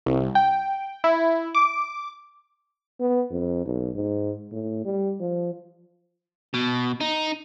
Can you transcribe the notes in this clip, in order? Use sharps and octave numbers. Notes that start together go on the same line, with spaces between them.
C2
G5
E4
D6
B3
F2
B1
G#2
A2
G3
F3
B2
D#4